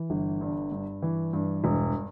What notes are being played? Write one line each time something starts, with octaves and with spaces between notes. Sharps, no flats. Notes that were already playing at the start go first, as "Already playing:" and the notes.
Already playing: E3
G1
G2
G2
E3
G2
E1